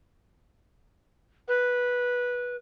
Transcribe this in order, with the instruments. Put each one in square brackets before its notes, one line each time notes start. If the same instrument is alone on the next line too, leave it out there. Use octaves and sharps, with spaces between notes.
[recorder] B4